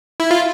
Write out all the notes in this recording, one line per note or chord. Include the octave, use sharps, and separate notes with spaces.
E4
F4